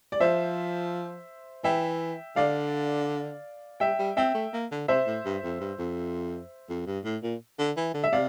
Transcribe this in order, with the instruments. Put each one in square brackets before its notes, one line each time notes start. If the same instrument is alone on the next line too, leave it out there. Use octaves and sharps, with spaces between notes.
[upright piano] D5
[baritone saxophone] F3 [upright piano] C5 E5
[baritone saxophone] E3 [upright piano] E5 G5
[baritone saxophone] D3 [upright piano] D5 F5
[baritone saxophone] G3 [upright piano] E5 G5
[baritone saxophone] G3
[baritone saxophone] C4 [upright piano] E5 G5
[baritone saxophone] A3
A#3
D3
[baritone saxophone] C3 [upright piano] C5 E5
[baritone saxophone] A2
G2
F2
G2
F2
F2
G2
A2
A#2
D3
E3
D3
[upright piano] E5
[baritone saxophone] C3 [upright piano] D5 F5